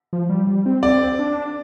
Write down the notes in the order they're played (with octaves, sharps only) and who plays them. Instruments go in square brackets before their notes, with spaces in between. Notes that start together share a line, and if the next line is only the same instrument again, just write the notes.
[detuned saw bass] F3
G3
G3
C4
[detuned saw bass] C4 [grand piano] D5
[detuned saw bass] D4